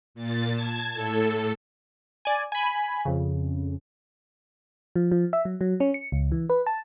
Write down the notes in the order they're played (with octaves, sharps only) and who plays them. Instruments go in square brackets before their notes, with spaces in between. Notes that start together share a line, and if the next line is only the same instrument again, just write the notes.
[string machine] A#2 A6
A5 G#6
A2 A4
[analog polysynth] D5 G#5
G#5 B5
F2 C#3
[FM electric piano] F3
F3
E5
F#3
F#3
C#4
C#7
C#2
E3
B4
A5